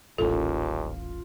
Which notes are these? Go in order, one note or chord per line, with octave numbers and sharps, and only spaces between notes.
D#1 A1 D#2 C#4 F4 A4